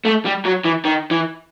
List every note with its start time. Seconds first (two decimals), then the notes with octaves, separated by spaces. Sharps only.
0.05 A3
0.25 G3
0.45 F#3
0.65 E3
0.85 D#3
1.11 E3